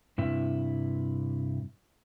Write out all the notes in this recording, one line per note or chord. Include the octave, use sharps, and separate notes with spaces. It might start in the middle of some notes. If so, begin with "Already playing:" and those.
G2 C3 E4